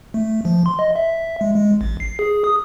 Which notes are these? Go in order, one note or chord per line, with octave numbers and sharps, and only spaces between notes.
A3
F3
C6
D#5
E5
G#3
G#3
A1
C7
G#4
D#6